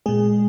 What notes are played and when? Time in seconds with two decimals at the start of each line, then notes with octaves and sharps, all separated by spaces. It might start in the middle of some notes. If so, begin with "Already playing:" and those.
0.06 A#2 G#3 G#4